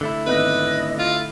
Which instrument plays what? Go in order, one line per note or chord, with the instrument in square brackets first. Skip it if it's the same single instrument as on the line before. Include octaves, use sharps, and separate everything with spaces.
[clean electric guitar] D3 A3 E4
[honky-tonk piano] G#1 B3 F#6 [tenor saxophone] B4 [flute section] D#5
[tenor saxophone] F4